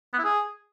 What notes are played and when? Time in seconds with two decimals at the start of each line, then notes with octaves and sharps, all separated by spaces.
0.13 B3
0.19 E4
0.24 G#4